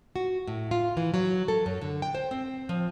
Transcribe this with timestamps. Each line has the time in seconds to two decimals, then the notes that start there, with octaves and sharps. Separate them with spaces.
0.16 F#4
0.47 A2
0.71 F4
0.97 E3
1.14 F#3
1.48 A4
1.66 F#2
1.81 D3
2.02 G5
2.15 C5
2.31 C4
2.69 F3